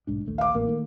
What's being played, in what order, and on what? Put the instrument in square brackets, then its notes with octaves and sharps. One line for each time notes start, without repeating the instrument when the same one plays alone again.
[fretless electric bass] B1 G#2 D4
A#1 D#2 A3
[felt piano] F5 D6
[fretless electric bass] A1 [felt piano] A#3
[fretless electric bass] D#3 A3